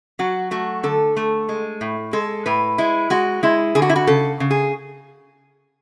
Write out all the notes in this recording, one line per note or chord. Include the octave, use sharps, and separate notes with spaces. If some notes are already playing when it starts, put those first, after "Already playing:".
F#3 F#4
A3 F#4
D3 A4
A3
G#3
A2
G#3 A4
A2 B4
G#3 E4
G#3 F#4
G#3 E4
D3 G#4
F#4
E4
F#4
C#3 A4
C#3
G#4